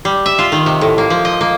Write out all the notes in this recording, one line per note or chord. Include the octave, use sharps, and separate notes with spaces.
G3
E5
F4
D#3
C3
A2
A#3
F3
D#5
A#3